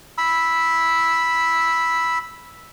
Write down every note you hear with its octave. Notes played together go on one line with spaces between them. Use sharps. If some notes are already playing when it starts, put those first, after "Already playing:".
B5 E6